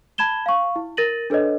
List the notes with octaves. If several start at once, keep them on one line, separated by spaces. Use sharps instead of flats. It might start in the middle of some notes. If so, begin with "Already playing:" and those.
A5 B5 G#6 E7 G7
F5 C#6
E4
A#4 A6 A#6 D#7 F#7
D4 A4 B4 C#5 D#5